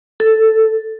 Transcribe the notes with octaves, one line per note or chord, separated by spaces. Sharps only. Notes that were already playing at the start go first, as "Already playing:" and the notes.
A4